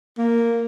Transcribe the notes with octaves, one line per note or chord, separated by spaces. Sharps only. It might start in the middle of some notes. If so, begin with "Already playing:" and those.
A#3